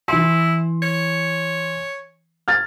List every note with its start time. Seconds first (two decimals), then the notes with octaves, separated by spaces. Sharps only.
0.08 E3 E4 C6
0.82 C#5
2.48 F6 G#6 A6